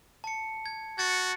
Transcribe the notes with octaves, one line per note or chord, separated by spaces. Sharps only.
A5 C#7
G#6
F#4 G#6 A6 C#7